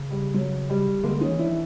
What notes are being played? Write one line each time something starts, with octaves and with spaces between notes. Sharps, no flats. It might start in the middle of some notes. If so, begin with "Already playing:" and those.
Already playing: C#3
G3
F#3
G3
D3 G#3 A#3
C#4 D#4
E3
D4 E4
F3
E3